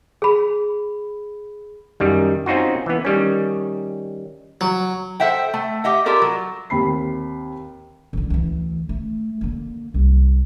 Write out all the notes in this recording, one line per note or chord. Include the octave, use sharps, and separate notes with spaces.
G#4 B5
F#2 D#3 G3
C4 C#4 D#4 F4 F#4
E3 B3
D#3 G3 C#4
F#3
A4 C5 E5 F#5 G5
A3
G4 D#5 E5 F#5
F4 G4 A4 A#4 D5
F#3
D#2 C4 B5 C7
D1 D3
D2 E3
A3
D3 A#3
C2